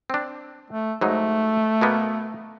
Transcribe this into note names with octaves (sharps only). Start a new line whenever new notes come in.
C4 D4
A3
G#2 F#3 A3 D#4
B2 A#3 B3